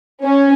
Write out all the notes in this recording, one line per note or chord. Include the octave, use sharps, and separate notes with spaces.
C#4